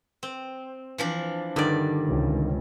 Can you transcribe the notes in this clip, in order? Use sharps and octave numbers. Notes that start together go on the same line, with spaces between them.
C4
E3 F3 D4
G2 D3 D#3 D5
C#2 C3